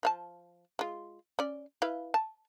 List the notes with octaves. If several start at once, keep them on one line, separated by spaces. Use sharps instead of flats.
F3 F5 A5
G#3 F4
C#4 D5
E4 B4 F5
A5